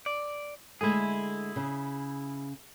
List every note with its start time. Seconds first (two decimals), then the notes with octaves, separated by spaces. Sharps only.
0.06 D5
0.81 D3 G#3 A3 E4 G#4
1.56 C#3